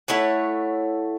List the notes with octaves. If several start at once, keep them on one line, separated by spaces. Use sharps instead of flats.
A3 E4 C#5 F#5